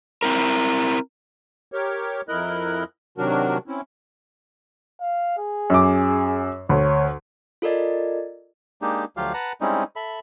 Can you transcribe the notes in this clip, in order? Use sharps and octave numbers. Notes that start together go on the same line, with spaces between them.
C4 E4 A#4
G4 A#4 C#5
F2 E4 A#4 D#5 F#6
C3 D#3 F#3 D4 F#4 A#4
C4 C#4 E4
F5
G#4
F#2 D6
D2 C#5
F4 A4 A#4 D5 D#5
G#3 A#3 D4 D#4 G4
D2 F3 F#3 F4 G4 F5
B4 F#5 A5 A#5
G3 G#3 C4 C#4 D#4 E4
A4 E5 B5